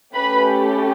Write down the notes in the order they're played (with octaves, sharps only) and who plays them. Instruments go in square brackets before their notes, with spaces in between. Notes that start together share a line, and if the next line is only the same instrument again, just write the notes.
[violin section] A3 C#4 G4 B4 B5